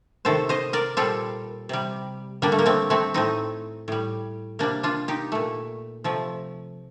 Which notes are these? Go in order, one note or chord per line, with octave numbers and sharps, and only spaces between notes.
C3 D#3 A3 A4 C5
C5 D#5
A#4 D5
A#2 G3 A4 C5
C3 G3
D3 G3 A#3 D4
A3
A#3
A3 C4
A3 C4
A2 A3 C4 D#4
A2 G3
C3 G3 A#3 D4
D4 F4
D#4 G4
A#2 A3
C3 F3 A3